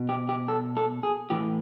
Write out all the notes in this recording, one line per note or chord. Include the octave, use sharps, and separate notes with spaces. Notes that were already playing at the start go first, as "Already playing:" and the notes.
Already playing: B2
G4
G4
A4
A4
G#4
A2 E3 G4